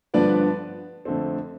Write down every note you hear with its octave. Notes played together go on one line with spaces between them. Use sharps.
G2 D3 F3 B3 D4 B4 D5
F2 D3 A3 C4